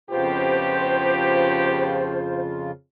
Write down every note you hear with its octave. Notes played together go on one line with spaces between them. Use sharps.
F2 A2 C#3 B3 F4 G4 C5